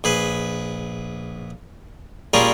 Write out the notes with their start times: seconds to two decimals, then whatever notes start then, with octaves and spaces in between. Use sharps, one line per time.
0.04 A#1 G#4 B4
2.34 A#2 G3 C#4 F4 G#4 A#4